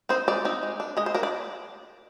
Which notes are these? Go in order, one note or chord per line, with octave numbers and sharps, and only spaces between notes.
C4 D#4 C5
G#3 D5
C4 D#4
G#3
D4
G#3 D#5
C5
D4 A#4
D5